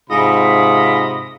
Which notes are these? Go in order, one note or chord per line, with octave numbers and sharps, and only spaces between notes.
G#2 C3 F4 D#5 B5